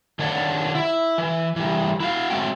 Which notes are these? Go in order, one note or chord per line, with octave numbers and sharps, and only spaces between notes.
D#3 D4 C#5 D5 F#5
E4
E3
E3 G3
E4 F#4 F5
F#3 G#3 A3 C4 F#4 G5